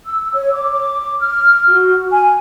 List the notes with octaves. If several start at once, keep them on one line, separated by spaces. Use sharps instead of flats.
E6
C#5
D6
F6
F#4
G#5